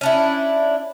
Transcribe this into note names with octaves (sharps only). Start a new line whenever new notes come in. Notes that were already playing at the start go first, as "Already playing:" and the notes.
C#4 D4 E4